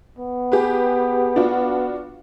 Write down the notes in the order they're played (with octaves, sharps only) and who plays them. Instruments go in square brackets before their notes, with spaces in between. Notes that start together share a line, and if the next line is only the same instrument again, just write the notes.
[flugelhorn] B3
[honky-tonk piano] G4 G#4 B4
D4 F4 F#4